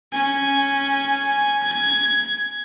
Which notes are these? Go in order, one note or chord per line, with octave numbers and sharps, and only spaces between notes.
C#4 G#5
G#6